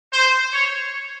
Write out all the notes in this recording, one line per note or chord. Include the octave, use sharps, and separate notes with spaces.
C5
C#5